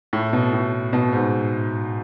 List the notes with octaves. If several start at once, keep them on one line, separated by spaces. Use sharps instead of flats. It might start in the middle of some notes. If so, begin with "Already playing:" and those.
A2
B2
A2
B2
G#2